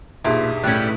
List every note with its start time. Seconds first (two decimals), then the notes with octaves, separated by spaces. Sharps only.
0.24 B1 E2 G2 A#2 G4 G#4 E5
0.64 A2 C#3 G3 C#4 E4 F#6 G6 C#7